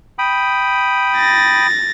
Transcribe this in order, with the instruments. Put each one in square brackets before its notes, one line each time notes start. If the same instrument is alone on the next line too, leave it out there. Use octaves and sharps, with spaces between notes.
[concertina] G5 B5 D#6
[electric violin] A6 A#6